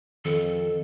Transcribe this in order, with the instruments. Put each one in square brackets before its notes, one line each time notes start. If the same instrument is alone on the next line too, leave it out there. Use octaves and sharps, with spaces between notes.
[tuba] F2 [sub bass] D#3 [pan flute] A4